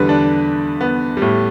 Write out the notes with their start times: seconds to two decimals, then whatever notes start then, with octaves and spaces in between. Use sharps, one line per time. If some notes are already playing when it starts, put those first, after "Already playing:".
Already playing: E2 D3 G3 B4
0.09 D4
0.81 B3
1.17 G3
1.22 A2